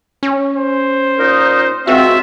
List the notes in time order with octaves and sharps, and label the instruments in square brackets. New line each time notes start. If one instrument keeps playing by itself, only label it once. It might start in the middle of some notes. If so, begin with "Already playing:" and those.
[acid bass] C#4
[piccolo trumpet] C5
[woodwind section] A#2 D#4 [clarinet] A#4
[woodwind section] C#2 C#4 F4 [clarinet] C4 [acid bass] F#4 [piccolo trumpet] E5